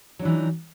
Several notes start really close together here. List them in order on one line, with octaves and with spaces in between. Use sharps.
F#3 D4 E3 D#4